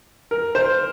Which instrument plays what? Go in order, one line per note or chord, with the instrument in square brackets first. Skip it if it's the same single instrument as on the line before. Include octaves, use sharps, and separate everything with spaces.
[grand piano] A#4
C5